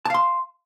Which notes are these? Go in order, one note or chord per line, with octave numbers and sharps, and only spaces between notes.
F5 A5 C6